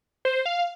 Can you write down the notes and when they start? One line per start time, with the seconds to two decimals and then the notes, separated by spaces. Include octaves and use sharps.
0.25 C5
0.46 F5